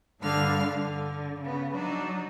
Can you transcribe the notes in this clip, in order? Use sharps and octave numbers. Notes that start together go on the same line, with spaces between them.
G2 D3 G3 D4 F5 F6
D3
C#3 B3
F#3 D4 D#4